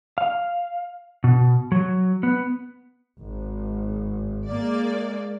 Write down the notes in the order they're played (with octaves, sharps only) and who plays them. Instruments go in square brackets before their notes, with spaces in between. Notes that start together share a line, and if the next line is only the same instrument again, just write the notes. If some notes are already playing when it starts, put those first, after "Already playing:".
[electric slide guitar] F5
B2
F#3
B3
[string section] G#1
G#3 A#3 D5